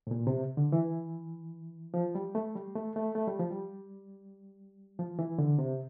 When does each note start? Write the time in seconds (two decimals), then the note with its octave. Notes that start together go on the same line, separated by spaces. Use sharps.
0.07 A2
0.11 A#2
0.27 C3
0.57 D3
0.72 E3
1.94 F3
2.15 G3
2.35 A3
2.56 G3
2.75 A3
2.96 A3
3.15 A3
3.27 G3
3.40 F3
3.50 G3
4.99 F3
5.19 E3
5.38 D3
5.59 C3